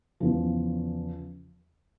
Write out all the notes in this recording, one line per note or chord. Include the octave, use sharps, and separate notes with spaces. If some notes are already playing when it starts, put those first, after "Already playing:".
E2 C#3 F3